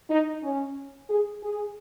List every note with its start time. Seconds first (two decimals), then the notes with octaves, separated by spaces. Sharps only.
0.10 D#4
0.43 C#4
1.10 G#4
1.42 G#4